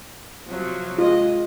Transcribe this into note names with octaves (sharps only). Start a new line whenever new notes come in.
C3 F3 F#3
G#3 F4 D#5